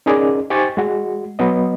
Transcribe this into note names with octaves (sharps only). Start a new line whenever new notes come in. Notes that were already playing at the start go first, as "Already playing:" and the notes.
C#4 D#4 G#4 A#4 D5
D#4 G4 C5 G#5 C#6 A6
G#3 F#4
F#3 B3 D#5